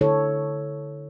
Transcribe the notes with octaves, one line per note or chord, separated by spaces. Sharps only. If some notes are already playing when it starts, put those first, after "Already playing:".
D3 E4 A4 C#5